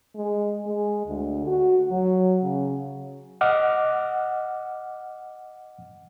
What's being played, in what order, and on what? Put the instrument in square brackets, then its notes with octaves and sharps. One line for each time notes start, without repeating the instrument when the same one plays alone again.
[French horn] G#3
G#3
D2
F#4
F#3
C#3
[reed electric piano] D#5 F#5 D6 F6